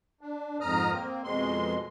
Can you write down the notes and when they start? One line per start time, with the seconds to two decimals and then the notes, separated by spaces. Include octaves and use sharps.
0.21 D4
0.61 F2 G#2 A#5 D#6 F6
0.92 A#3 C4
1.24 F2 B2 G#3 C6